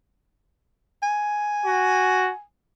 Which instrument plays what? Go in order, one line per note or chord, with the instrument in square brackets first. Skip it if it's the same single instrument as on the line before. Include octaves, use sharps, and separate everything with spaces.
[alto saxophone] G#5
[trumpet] F#4